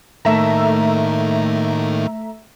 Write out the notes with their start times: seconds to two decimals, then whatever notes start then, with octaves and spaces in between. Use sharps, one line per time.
0.25 A2 D#3 A3 A#3 E5 A#5